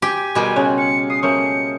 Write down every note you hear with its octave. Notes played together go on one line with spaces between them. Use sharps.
G4 C5 G#5
B2 G3 G#3 A#4 A5
C#3 G#3 C#5 F#5
F5 C#7
D#6 C7
A3 A#3 C#4 C5 C#7